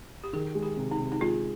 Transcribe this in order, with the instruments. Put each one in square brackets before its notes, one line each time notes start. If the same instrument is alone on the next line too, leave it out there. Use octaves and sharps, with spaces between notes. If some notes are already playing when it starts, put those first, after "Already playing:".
[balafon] G4
[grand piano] D#3 [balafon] G#4
[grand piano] G#3
[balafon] G4
[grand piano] C3
[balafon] D#4
[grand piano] C3
[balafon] D#4
[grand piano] G#3 [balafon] F4